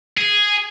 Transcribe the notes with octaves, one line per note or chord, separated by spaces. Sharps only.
G#4